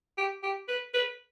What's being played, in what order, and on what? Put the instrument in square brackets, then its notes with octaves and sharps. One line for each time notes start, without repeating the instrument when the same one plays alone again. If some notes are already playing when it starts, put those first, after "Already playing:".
[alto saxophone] G4
G4
B4
B4